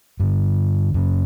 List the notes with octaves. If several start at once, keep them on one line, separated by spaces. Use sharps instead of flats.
G2 D3
F#2 C#3